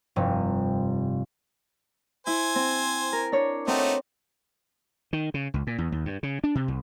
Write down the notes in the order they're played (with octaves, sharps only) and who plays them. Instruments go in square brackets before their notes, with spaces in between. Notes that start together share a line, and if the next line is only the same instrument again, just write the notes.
[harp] F1 G2 C3
[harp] E4 [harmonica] C5 G#5
[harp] C4
A#4
D4 C#5
[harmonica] A3 D#4 F#4 [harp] C4
[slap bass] D#3
C#3
C#2
A#2
E2
D#2
G2
C#3
D4
C3
C2